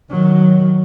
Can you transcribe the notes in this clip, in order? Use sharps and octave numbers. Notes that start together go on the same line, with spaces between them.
D#3 F#3